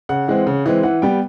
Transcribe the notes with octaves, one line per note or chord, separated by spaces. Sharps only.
C#3 F#5
E3 G#3 C4
C#3
E3 G#3 C4
E3 F#5
G3 B3 G5